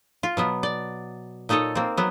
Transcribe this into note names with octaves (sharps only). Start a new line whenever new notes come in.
F4
B2 F#3 B3
D5
A#2 D#4 A4 C#5 D#5
A#3 C4
F#3 B3